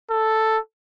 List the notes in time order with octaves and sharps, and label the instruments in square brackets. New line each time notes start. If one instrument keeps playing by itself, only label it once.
[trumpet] A4